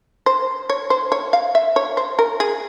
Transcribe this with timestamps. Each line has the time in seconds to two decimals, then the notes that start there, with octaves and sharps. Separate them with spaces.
0.26 C5
0.70 C#5
0.90 C5
1.12 C#5
1.33 F5
1.55 E5
1.76 C#5
1.97 C5
2.19 A#4
2.40 G#4